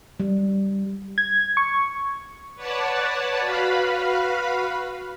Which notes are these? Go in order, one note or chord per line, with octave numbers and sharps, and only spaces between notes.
G3
G#6
C#6
B4 C#5 D5 F#5 A5
F#4 B4 F5 B5